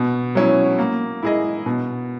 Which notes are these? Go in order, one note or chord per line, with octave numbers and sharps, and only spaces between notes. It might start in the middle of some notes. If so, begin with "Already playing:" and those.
Already playing: B2
F#3 C#4 E4
A#3
E4 G#4 D#5
B2